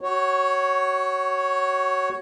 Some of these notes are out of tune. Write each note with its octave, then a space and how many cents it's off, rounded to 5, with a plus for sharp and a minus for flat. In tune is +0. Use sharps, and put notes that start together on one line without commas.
F#4 +20 C#5 +0